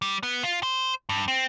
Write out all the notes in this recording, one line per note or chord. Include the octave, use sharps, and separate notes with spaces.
G3
B3
F4
C5
G2
C4